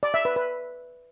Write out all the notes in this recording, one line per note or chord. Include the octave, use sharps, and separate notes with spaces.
D5
E5
B4
B4